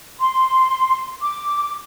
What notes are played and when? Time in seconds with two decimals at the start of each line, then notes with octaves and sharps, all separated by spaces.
0.20 C6
1.21 D6